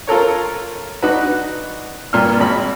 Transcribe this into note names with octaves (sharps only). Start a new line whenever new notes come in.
F4 A4 A#4 C#5
D4 D#4 F#4 B4
G2 A#2 F6
G#1 B5